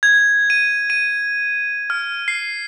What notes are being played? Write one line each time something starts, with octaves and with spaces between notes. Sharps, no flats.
G#6
D#7
D#7
F6
C7